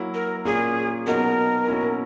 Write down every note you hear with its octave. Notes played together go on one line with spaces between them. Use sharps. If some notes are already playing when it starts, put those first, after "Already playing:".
Already playing: F#3 A#3 E4
A#4
A#2 A#3 C#4 G#4
B2 F#3 B3 D#4 A#4
B2 A#3 C#4 E4